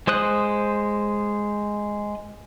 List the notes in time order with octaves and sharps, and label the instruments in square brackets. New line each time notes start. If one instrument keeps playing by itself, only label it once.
[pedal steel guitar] G#3 C5 D#6 F#6